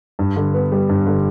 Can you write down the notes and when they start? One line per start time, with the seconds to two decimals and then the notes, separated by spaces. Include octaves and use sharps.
0.19 G2
0.36 D3
0.54 B3
0.72 G3
0.89 G2
1.07 D3